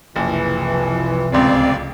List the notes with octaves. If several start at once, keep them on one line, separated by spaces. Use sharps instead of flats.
F#1 C2 E3 F3
D1 C#2 C4 D5